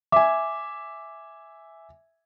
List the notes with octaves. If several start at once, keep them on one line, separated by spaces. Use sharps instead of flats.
E5 G#5 D6